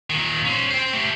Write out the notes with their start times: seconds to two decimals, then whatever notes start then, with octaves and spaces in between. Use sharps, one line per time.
0.10 A#2 D#3
0.45 C#4 C5
0.70 C5 G5
0.93 A3 G4